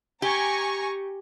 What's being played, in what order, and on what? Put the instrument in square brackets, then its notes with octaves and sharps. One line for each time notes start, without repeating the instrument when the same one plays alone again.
[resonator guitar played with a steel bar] G4 [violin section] G#5 A#5 C#6